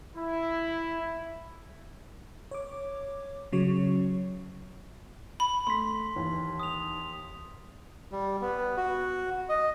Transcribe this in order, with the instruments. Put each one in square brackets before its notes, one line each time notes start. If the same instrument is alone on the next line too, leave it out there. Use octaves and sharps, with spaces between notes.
[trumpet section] E4
[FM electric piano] C#5 D6
C#3 F#3 C#5 C#6
[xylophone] B5
[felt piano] A3 [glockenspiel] C6 B6
[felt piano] D#2 E3
[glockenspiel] D#6 F7
[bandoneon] G3
B3
F#4
D#5